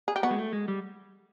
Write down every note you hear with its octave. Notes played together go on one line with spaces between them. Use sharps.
G#4
G4
B3 F#4
G#3
A3
G#3
G3